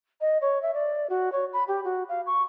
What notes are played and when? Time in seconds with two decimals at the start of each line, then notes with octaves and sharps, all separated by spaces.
0.21 D#5
0.41 C#5
0.62 E5
0.74 D5
1.10 F#4
1.32 C#5
1.53 B5
1.68 G4
1.84 F#4
2.09 F5
2.26 C#6